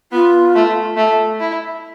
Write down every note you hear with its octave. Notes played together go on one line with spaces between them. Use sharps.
B3 F4
A3
A3
E4